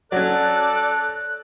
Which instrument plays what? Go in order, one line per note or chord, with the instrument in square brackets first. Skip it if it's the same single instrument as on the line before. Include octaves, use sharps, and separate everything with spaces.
[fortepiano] F#3 C#4 [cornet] A4 [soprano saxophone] D5 [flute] F#6